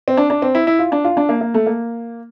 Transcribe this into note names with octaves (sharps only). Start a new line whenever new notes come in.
C4
D4
D4
C4
E4
E4
F4
D4
F4
D4
A#3
A#3
A3
A#3